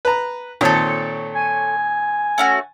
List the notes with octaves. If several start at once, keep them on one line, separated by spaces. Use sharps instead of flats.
B4 A#5
A#2 D#3 C4 A4 C#5
G#5
A3 C#4 F#4